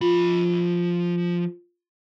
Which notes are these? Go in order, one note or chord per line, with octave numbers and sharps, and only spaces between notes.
F3 F4 B5